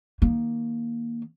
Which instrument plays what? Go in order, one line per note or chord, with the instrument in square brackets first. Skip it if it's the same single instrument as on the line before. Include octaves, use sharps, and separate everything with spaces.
[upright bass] D#3 A#3